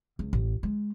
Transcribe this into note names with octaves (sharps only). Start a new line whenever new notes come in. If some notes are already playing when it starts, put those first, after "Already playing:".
C#2
A1
G#3